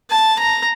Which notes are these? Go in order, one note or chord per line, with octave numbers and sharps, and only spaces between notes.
A5
A#5